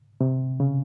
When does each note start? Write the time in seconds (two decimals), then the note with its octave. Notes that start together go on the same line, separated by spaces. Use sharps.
0.21 C3
0.60 C#3